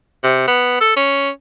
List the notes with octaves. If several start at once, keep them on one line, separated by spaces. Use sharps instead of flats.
C3
B3
A4
C#4